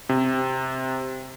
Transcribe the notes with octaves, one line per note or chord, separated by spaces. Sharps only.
C3